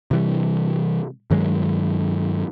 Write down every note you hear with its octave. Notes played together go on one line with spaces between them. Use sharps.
C3 E3 G3
G2 D#3 F#3 G#3